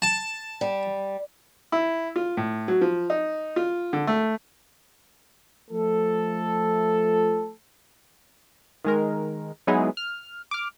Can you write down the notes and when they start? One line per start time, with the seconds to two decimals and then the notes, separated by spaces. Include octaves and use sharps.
0.02 A5
0.61 G3
1.72 E4
2.16 F4
2.37 A2
2.68 F#3
2.81 F3
3.10 D#4
3.56 F4
3.93 D3
4.07 A3
5.70 F3 A3 A4
8.85 D#3 G#3 A#4
9.67 F#3 G#3 B3 D#4 E4 G#4
9.97 F6
10.51 D6 F6